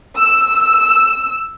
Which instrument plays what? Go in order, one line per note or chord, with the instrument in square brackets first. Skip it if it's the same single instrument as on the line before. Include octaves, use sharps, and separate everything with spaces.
[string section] E6